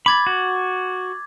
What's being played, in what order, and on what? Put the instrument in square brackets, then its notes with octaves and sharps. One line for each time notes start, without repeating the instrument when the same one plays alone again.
[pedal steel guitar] B5 [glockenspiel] D6 G#6 A6
[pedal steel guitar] F#4